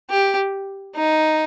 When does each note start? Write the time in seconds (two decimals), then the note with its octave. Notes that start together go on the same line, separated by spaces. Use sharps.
0.10 G4
0.96 D#4